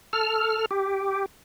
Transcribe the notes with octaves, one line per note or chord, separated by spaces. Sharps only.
A4 F6
G4